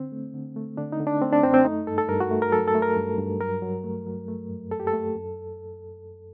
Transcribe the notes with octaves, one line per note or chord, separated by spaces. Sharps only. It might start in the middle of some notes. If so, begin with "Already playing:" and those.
Already playing: D3 C4
A3
D3
A3
D3 D4
D#4
D3
D4
A3 C4
D4
F#2 C4
C4
A3 D#4
G2 A4
A4
G2 A#4
F#4
A3
A#4
F#3 A4
A4
A3
A#4
G2
G2
F#3 A#4
F#3
A3
F#3
A3
F#2
F#2 A4
G4
A4
A3
F#2